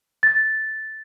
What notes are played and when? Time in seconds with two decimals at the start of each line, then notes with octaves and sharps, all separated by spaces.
0.23 A6